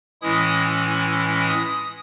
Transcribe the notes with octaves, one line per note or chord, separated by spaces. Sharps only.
A2 E3 G#3 C#4 E4 D#6
E6
D#6